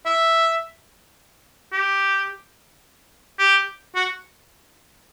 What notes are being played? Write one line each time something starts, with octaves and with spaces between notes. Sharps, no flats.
E5
G4
G4
F#4